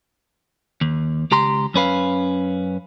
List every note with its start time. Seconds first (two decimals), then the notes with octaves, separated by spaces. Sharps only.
0.81 D#2
1.31 C#2 G4 A#5 C6
1.74 F#2 C#4 B4 F5